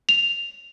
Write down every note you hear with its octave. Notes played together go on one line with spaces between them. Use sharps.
F7